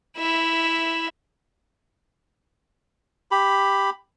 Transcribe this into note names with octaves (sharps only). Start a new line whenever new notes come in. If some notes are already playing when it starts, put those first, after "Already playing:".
E4 E5
G4 B5